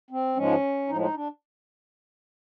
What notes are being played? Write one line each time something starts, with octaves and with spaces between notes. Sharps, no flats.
C4
G#2 F3 G#3 C#4
A2 F3 G#3 D#4
D#4
D4